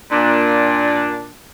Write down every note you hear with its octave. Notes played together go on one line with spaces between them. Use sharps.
A#2 D4